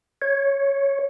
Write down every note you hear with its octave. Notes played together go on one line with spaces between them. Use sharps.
C#5